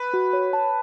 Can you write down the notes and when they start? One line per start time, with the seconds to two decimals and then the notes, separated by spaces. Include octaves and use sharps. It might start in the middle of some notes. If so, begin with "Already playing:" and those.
Already playing: B4
0.14 F#4
0.33 C#5
0.53 A5